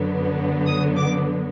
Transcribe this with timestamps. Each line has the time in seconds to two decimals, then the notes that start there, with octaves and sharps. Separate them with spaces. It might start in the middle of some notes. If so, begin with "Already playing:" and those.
Already playing: F#2 D3 F#3 B3
0.67 D#6
0.97 D6